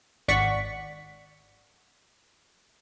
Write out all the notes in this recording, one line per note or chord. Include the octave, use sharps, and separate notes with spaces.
G#1 D5 F#5 C#6 B6